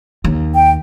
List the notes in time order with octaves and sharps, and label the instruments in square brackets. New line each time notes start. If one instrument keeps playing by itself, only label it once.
[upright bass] D#2
[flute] G5